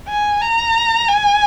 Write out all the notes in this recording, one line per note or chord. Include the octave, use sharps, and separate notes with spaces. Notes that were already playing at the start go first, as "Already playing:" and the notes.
G#5
A#5
G#5